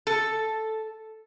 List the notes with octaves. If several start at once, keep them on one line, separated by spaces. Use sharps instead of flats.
A4